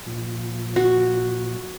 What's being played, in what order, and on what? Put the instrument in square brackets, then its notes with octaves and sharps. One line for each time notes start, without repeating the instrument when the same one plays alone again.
[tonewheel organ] A#2 F3
[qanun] F#4